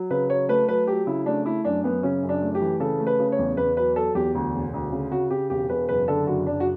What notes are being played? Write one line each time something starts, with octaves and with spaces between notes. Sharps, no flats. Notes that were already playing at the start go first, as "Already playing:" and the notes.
Already playing: F#3
C#3 B4
F#3 C#5
A3 B4
F#3 B4
F#3 G4
C#3 E4
A3 D4
A3 E4
F#2 D4
F#2 B3
C#3 C#4
F#2
D4
A3
G4
E3
C#3 A4
A3
B4
C#3
C#5
E2
E2 B4
F#3 B4
F#3 A4
E2 G4
D2
E1
D2
C#3
C#3 F#4
C#3 G4
E1 G4
E1 B4
F#1 B4
D3 A4
F#1 F#4
F#1 D4
F#4